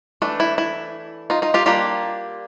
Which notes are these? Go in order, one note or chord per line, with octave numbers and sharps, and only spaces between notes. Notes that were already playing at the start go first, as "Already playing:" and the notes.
E3 A3 D4
E4
E4
D#4 F4
D#4 F4
F4 G4
G3 A#3 D4 F4 G4